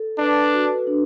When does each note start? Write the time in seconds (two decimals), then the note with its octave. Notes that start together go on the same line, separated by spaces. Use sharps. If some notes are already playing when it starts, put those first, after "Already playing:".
Already playing: A4
0.19 D4 B4
0.53 F#4
0.87 D4